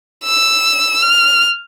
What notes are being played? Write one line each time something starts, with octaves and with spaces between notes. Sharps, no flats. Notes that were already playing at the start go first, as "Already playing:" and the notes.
E6
F6